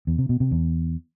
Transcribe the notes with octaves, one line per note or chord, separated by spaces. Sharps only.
E2
C3
B2
C3
E2